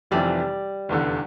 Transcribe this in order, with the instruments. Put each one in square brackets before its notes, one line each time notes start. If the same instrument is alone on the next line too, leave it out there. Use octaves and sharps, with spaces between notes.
[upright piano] F1 F2 C3 E3 [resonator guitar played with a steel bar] G3
[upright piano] F1 E2 D3